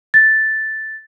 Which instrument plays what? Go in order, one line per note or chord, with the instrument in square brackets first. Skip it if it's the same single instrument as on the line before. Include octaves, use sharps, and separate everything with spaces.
[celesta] A6